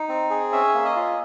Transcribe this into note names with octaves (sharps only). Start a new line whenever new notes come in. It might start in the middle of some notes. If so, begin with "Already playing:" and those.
Already playing: D#4
C4
G#4
C#4 E5
A#3
D#5
F4